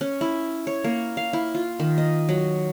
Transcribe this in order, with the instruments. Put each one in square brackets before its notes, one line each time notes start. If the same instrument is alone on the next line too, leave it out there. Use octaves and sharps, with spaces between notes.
[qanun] C#4
E4
C#5
A#3
F5
E4
F4
D#3
D#5
F#3